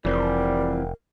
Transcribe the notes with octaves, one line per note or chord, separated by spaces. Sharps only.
F1 E3 F3 G3 C4 A#4